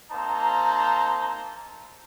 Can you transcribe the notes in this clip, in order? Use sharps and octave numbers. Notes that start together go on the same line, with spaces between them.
A#3 C4 D#4 C5 A5 A#5